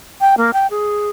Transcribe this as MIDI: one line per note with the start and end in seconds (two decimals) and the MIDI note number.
0.21 0.35 79
0.37 0.51 58
0.53 0.67 79
0.70 1.10 68